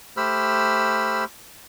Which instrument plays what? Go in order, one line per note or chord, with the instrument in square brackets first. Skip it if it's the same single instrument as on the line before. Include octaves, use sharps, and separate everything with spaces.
[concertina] A3 G4 C5 B5 E6 F6